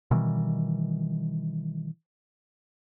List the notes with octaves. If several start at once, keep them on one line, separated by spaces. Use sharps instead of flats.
B2 D#3 E3 G3